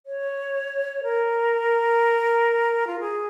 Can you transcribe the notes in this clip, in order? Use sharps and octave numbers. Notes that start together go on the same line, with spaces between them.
C#5
A#4
F4
G#4